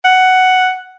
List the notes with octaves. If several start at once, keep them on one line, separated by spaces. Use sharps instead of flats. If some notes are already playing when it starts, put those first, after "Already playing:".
F#5